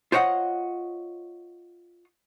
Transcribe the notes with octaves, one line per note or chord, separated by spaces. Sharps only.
F4 C5 C#5 D#5 F#5